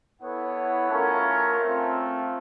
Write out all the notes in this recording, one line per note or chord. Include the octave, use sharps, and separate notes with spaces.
B3 E4 A4 C#5 F#5
A3 C#4 F4 A#4
A3 C4 F4